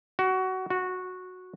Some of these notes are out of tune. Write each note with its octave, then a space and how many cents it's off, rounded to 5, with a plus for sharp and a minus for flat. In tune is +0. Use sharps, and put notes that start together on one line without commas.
F#4 +20
F#4 -10